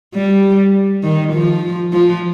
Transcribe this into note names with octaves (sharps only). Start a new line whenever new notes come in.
G3
D#3
F3
F3